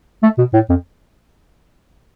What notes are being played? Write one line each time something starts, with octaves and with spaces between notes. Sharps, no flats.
A3
B2
A2
F2